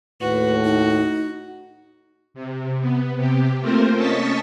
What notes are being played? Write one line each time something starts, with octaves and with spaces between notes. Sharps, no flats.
D#2 A2 F#4 B4
D#4
C3
B3
C3 G4
A3 A#3 C4 F4 A#4 C5
C#4 D#5 A5 C#6 A6 B6